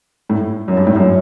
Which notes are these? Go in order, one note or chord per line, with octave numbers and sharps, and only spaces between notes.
A2
F#2
G2
A2
F#2